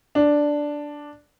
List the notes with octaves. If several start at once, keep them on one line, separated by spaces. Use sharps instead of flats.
D4